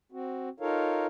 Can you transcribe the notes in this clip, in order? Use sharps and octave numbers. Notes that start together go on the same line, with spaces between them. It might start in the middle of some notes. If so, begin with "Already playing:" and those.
C4 F#4
D#4 F4 A4 A#4 C#5 F5